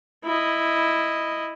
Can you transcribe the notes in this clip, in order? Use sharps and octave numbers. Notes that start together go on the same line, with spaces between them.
E4 D#5